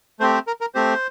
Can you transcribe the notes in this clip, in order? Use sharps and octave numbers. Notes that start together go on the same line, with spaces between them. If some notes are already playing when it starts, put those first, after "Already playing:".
A3 C4 G4 C5
C5
A#4
A#4
A3 C4 G4 C5